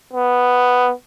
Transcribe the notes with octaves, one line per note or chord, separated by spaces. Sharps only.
B3